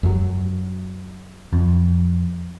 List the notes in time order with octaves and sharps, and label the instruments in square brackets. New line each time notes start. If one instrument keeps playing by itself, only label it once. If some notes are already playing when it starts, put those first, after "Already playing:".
[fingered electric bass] F#2 F#3
[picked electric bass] F2